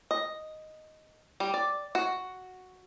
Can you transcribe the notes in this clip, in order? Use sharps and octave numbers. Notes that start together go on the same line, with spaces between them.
D#5
G3
D5
F#4